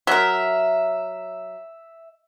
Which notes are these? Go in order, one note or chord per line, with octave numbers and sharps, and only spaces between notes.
F#3 A#4 E5